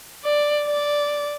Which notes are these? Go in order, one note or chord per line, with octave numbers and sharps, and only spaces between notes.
D5
D5